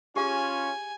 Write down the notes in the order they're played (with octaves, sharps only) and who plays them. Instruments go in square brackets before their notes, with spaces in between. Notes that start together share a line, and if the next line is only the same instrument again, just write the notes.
[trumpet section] C#4 F4 [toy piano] G4 G#4 F5 [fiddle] G#5